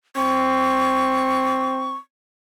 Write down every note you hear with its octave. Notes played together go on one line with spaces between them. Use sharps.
C4 C#6